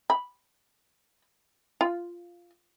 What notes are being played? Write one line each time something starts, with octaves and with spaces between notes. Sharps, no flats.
B5
F4